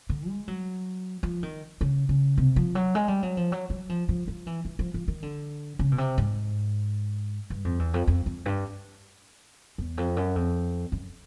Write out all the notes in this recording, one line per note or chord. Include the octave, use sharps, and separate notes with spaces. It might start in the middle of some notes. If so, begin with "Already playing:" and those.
D3
G#3
F#3
F3
D#3
C#3
C#3
C3
F3
F#3
G#3
G3
F#3
F3
F#3
F#3
F3
F3
F3
E3
E3
F3
F3
D#3
D3
C#3
B2
C3
G#2
G2
F2
E2
F2
F2
F2
G2
E2
F2
F#2
F2
F#2